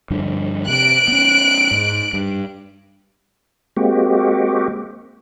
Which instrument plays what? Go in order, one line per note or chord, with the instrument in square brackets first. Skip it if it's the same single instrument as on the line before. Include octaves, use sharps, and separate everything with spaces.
[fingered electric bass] G2 D3 F3
[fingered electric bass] C3 [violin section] F#6 D7
[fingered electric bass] B3 C#4
G#2
G2
[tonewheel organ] G#3 A#3 C4 F#4 G4